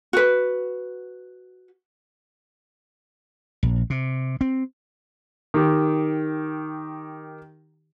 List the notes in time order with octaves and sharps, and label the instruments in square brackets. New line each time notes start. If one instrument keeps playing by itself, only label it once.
[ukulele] F#4 B4
[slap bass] A#1
C3
C4
[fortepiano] D#3 G4